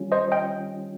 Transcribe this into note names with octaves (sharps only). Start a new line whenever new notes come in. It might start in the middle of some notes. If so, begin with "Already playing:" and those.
Already playing: D#3 G3 C#4 F4
C5 D#5
D#5 G5